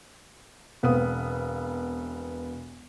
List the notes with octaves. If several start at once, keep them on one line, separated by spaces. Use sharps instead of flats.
E1 B3 C4 F5 D#6